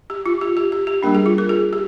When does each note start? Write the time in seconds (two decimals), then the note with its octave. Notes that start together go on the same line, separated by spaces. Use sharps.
0.10 G4
0.26 F4
0.41 G4
0.57 G4
0.72 G4
0.87 G4
1.03 G3 A#3 D4 A#4
1.15 G#4
1.26 F4
1.38 A#4
1.49 G#4
1.73 G4